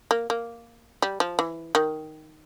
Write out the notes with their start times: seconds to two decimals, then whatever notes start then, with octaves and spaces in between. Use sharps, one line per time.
0.11 A#3
0.30 A#3
1.02 G3
1.20 F3
1.39 E3
1.75 D#3